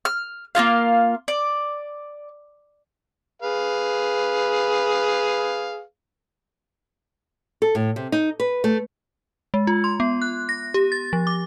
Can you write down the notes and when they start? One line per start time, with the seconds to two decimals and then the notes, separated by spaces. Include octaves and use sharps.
0.05 F6
0.55 A#3 D#4 F4 F5
1.28 D5
3.42 G#4 B4 F5
7.62 A4
7.75 A2
7.96 C3
8.12 D#4
8.40 B4
8.64 A3
9.54 G#3
9.67 F4
9.84 C6
10.00 B3
10.22 F#6
10.49 A#6
10.74 G4
10.92 A6
11.13 F3
11.27 D6